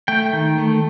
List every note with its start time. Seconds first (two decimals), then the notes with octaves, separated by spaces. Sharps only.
0.08 A3 G5
0.33 D#3
0.58 A3